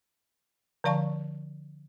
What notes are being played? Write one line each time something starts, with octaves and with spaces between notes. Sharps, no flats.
D3 F3 D5 F5 A5 C#6